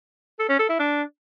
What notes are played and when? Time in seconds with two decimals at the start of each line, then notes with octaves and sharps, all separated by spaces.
0.39 A4
0.49 C#4
0.59 A4
0.69 E4
0.79 D4